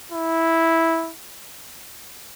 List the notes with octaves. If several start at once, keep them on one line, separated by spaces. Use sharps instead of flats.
E4